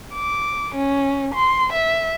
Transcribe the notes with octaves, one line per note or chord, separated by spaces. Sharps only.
D6
C#4
C6
E5